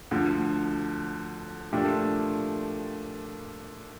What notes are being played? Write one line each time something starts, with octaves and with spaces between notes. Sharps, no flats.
D2 D3 F3
A#2 F3 A3 D4 G4